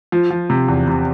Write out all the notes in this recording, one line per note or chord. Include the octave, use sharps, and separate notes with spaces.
F3
F3
C3
E2
C3